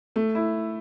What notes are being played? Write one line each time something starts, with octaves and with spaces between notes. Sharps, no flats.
A3
E4